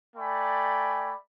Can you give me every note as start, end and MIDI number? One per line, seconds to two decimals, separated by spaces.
0.16 1.13 57
0.16 1.13 74
0.16 1.13 79
0.16 1.13 80
0.16 1.13 83